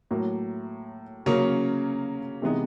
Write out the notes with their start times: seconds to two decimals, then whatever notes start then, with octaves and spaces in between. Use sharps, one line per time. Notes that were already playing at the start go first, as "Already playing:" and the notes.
0.11 A2 F#3 A#3
1.26 C#3 F#3 A#3 C#4
2.42 C3 E3 G#3 B3 D#4